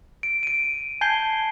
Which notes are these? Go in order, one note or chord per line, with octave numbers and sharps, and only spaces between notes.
D7
D7 D#7
G#5 A5 G6 G#6 C7 G7